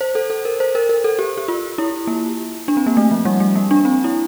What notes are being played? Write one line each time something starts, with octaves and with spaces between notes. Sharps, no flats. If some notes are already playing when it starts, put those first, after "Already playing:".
C5
A4
A4
A#4
C5
A#4
A#4
A4
G4
G4
F4
E4
A#3
D4
C4
A#3
A3
F3
G3
A3
A#3
D4
C4
E4